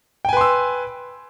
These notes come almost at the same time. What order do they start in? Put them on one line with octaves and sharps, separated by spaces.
G5 G#5 B4 C6 E6